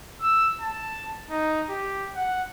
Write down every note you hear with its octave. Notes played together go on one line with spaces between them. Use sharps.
E6
A5
D#4
G4
F#5